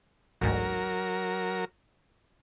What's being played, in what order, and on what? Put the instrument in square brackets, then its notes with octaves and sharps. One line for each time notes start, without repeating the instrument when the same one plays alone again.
[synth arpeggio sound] A1 D2 G#2 [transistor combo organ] F#3 A#4